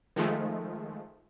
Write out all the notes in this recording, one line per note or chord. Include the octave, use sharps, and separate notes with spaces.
D#3 F3 G#3 A3